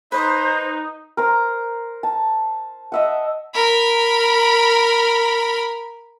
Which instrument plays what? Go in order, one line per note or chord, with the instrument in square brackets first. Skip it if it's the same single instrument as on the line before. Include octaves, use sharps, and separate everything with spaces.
[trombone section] D#4 [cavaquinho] B4 D#5 [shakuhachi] C5
[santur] A#4 C5 A#5
A5
D#5 E5 F#5
[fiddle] A#4 B5